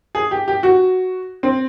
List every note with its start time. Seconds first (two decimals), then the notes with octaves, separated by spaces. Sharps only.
0.15 G#4
0.31 G4
0.48 G4
0.63 F#4
1.43 C4